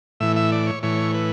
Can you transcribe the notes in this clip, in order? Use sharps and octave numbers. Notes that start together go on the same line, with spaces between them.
A2 E3 E5
E5
D5
C#5
A2 E3 C#5
B4